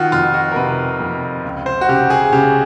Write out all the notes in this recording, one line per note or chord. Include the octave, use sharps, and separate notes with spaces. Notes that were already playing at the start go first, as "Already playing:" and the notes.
Already playing: D#3 F4 F#4
F2 F4
F#4
A#4
C3 B4
F2
C#2
C5
F#4
C#3 G4
G#4
C#3 G4